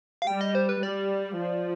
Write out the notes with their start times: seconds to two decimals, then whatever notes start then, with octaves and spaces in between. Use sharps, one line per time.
0.22 F5
0.27 G3 G5
0.41 D#5
0.55 C5
0.69 B4
0.83 G3 D5
1.38 F3